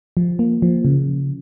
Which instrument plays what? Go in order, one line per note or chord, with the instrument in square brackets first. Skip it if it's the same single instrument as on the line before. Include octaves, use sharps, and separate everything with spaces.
[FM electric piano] F3
A#3
F3
C#3